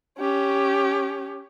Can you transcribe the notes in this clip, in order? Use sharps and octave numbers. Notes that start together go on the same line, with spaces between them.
C#4 G4